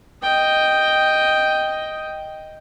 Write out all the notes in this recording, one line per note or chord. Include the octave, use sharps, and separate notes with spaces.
D#5 G5